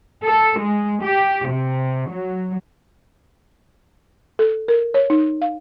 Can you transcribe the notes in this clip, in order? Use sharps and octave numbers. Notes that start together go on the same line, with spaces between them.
A4
G#3
G4
C3
F#3
A4
A#4
C#5
D#4
F5